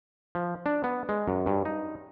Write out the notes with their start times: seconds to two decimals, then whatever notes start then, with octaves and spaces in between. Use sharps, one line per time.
0.35 F3
0.66 D4
0.84 B3
1.09 G#3
1.28 F#2
1.46 G2
1.65 D#4